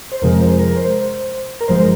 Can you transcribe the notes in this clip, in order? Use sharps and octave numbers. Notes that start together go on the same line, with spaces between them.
C5
F2 C3 F3 G#3 A#4
A#4
C5
A#4
C5
A#4
G1 G2 F3 G#3 C5